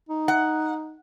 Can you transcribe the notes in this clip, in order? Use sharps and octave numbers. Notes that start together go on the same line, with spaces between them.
D#4
F#5